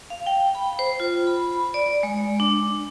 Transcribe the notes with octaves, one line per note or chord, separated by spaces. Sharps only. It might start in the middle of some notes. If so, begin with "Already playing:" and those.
F5
G5
B5
C5
F4
B5
D5
G#3
D4